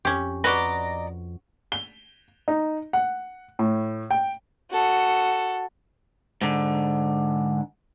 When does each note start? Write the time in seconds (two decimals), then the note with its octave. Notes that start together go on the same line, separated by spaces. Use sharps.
0.05 F2 C#4 G4
0.44 F#4 B4 D5 D#5 A#5
1.72 G7
2.48 D#4
2.93 F#5
3.59 A2
4.11 G5
4.71 F#4 A4
6.41 G#2 D3